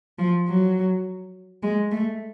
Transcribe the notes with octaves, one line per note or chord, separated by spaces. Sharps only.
F3
F#3
G#3
A3